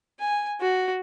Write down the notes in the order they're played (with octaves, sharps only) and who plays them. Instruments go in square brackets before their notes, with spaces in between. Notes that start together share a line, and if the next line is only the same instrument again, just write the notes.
[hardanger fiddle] G#5
F#4